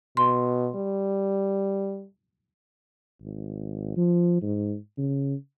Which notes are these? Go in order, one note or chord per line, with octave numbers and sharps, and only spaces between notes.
B2 C6
G3
G#1
F3
G#2
C#3